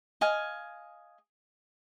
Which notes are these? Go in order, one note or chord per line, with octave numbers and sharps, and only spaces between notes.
D#5 F5 G#5